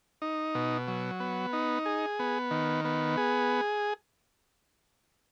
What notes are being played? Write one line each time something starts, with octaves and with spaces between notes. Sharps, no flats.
D#4
B2
F#3
B3
D#4
G#4
B3
D#3
B3
G#4